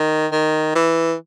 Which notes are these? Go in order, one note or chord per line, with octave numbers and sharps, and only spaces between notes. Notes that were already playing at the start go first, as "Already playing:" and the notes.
Already playing: D#3
D#3
E3